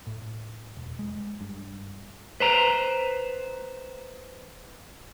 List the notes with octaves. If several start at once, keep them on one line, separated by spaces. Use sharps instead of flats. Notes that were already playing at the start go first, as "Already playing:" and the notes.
A2
E1
G#3
G2
B4 C5 A#5